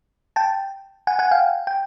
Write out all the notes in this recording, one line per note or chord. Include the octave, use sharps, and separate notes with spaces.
G5 A5
F#5 G#5
F#5 G#5
F5 G5
G5